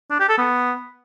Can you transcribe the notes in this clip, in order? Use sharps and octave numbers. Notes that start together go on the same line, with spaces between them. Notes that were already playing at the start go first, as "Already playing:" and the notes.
D4
G4
A4
B3